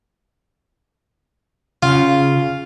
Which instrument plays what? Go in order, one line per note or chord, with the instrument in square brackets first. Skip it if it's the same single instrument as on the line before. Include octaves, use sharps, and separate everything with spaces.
[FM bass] C#3 [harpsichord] F4